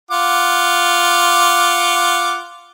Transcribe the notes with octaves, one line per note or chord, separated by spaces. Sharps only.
F4 F#5 D6